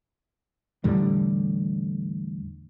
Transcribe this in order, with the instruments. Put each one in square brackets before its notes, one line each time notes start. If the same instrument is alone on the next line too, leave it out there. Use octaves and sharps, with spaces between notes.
[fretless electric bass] E2 A2 D3 G3